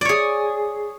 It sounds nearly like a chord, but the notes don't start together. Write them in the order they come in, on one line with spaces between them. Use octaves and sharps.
D5 C#5 G#4